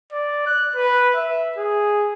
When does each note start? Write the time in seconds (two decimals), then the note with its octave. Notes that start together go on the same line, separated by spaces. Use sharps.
0.12 D5
0.46 F#6
0.75 B4
1.15 E5
1.57 G#4